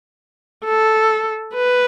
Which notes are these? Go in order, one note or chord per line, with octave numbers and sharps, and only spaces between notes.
A4
B4